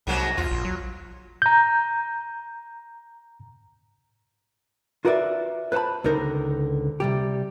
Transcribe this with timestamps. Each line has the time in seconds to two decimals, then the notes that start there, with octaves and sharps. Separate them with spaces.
0.07 C2 G#2 F#3 A#3
0.37 E2 F4
0.51 A#1
0.65 F#3
1.42 A#5 G6
5.05 F4 F#4 A#4 B4 D5 E5
5.72 B4 C5 F#5 A5 B5
6.04 C#2 D3 D#4 A#4 C5
7.00 C3 G3 G4